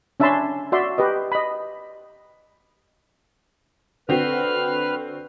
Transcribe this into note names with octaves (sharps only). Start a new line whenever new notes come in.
C#4 D4 E5 A5 B5 C6
F#4 D5 E5 C6
G4 B4 D#5
D#5 B5
D3 C4 F#4 B4 F6